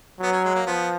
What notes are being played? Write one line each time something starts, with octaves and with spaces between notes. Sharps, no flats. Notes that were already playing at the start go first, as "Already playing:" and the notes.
F#3 B3
C#4
G#3
A#3
F3 B3